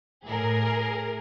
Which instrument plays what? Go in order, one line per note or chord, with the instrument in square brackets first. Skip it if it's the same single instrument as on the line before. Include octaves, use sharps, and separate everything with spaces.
[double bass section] A2 [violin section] G#4 A#4